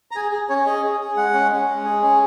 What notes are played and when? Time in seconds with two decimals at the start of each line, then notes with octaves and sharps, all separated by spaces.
0.11 A#5
0.16 G#4 G#5
0.32 G#4
0.49 C#4 C#5
0.66 G#4 D#5
0.83 G#4
1.00 G#4
1.17 G#3 F#5
1.34 C#4
1.52 C#4
1.68 G#3
1.85 G#4
2.02 C#4